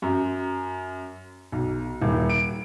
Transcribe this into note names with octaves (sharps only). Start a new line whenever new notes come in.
F#2
B1
D#1
D7